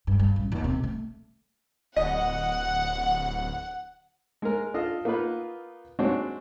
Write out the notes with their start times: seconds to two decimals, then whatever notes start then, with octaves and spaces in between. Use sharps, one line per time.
0.07 G2
0.20 G2
0.36 A1
0.52 D#2
0.64 C3
0.84 A3
1.96 D1 D#5 F#5
4.42 G#3 A#4
4.74 D4 F4 A4 D#5 F5
5.05 A#3 B3 D#4 F4 B4
5.99 G#3 C4 D4 F#4 C#5